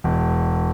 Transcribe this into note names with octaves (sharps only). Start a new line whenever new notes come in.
E1